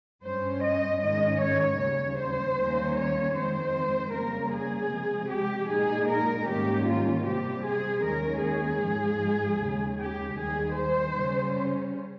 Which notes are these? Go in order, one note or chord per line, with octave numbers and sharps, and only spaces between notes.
G2 G3 C#4 C5
D#5
G#2 D#3 G#3 C#4 D#5
C#5
D#2 C#3 G3 C#5
C5
D#2 D#3 G3 A#3 C#4
C#5
F2 D#3 G#3 C4 C5
C#3 G3 A#3 A#4
G#4
C3 F3 G#3
G4
A#2 G#3 D#4 G#4
A#4
G#2 D#3 G3 A#3 C#4 G4
F4
C3 G3 C4 G4
G#4
D#2 D#3 G#3 C#4 A#4
G#4
G#2 F3 G#3
D#2 C#3 G#3
G4
D#2 D#3 G3 G#4
C5
C#3 G3 C#4